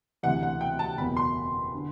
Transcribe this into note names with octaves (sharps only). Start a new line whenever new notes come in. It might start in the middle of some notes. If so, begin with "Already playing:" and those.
D2 C3 E3 F#5
F#5
G5
A5
F#1 E2 B2 B5
C6
D3